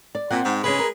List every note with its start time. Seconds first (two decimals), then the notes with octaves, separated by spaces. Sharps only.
0.15 D5
0.30 A#2 C4 F#5
0.45 G#2
0.64 C#3 G#3 C#4 G#4 B4
0.79 A#4